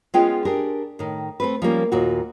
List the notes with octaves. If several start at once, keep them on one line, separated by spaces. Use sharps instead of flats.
G#3 B3 C#4 F4 G#4 G5
D4 G4 G#4 A#4
A2 D#3
A3 C4 B4
F3 G3 A#3 C#4
D#2 A#2 F#4